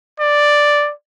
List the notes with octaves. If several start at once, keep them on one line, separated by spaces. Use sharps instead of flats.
D5